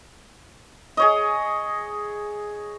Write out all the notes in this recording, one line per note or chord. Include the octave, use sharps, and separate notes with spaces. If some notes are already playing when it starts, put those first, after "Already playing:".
G#4 C#5 D#5